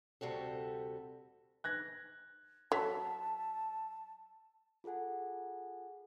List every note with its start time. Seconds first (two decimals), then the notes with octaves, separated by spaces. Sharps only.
0.21 D2 C3 G3 F#4 A4
1.64 F#6 G#6 A#6
2.72 F#3 A4 A5 B6
4.84 F4 G#4 A4 F#5 G#5